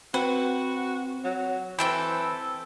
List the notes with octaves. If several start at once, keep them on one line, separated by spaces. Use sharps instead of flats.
C4 F#4 B4
F#3
E3 C4 A4 G5 B5